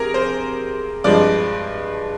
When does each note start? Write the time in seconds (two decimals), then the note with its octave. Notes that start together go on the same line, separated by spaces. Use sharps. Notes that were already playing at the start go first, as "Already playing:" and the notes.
Already playing: C3 G#4 A#4
0.14 C5
1.04 G2 F3 G#3 D5